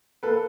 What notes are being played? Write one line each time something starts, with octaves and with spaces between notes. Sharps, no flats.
A#3 A4 B4